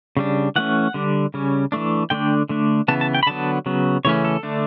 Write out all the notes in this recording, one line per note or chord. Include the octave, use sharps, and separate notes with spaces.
C#3 G3 D4
E3 A3 C#4 F#5
D3 G3 D4
C#3 G3 C#4
E3 A3 D4
D3 A3 D4 G5
D3 A3 D4
C#3 E3 B3 A5
A5
G5
B5
D3 F#3 B3 A5
C#3 F#3 B3
C#3 E3 A3 C#4 C#5
A4
D3 A3 D4